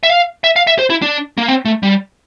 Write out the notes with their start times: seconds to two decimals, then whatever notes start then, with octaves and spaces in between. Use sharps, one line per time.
0.03 E5
0.10 F5
0.44 E5
0.56 F5
0.67 E5
0.79 C5
0.90 E4
1.02 D4
1.38 A#3
1.48 C4
1.65 A3
1.83 G3